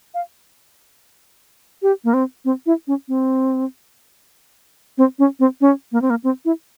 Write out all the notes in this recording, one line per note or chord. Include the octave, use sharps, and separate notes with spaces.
F5
G4
A#3
C4
C4
E4
C#4
C4
C4
C#4
C4
C#4
A#3
C4
A#3
C4
E4